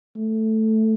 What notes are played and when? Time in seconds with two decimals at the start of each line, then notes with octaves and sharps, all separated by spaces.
0.17 A3